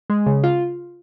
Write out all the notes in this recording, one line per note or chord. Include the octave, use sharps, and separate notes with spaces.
G#3
C#3
F4